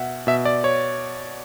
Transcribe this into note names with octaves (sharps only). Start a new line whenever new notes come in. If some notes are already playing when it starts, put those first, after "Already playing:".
Already playing: B2 E5 F#5
B2 E5
D5
C#5